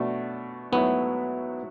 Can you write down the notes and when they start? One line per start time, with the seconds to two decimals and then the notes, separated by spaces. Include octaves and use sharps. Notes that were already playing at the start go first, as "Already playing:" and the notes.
Already playing: B2 A3 D4 F#4
0.72 G#2 F#3 A3 B3 E4